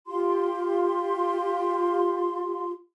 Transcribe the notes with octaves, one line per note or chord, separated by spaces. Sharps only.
F4 G4 C6